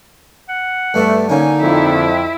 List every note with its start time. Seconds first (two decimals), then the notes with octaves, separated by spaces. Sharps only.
0.49 F#5
0.94 G2 A3 B3 D4
1.30 D3 A#3 C#4 D#4 G#5
1.61 F2 E4